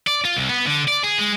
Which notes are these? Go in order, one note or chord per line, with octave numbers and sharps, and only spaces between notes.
D5
F4
C2
B3
D3
D5
G#4
G#3